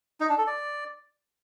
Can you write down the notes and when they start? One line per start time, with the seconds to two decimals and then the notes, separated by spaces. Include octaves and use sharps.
0.20 D#4
0.29 D4
0.38 A4
0.47 D5